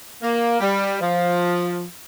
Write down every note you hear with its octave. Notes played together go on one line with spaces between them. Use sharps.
A#3
G3
F3